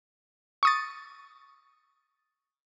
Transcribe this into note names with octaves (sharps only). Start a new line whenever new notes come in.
C#6 D#6 A6